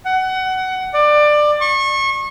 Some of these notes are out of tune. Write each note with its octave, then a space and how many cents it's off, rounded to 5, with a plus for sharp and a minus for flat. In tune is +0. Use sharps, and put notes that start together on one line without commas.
F#5 +20
D5 +20
C#6 -30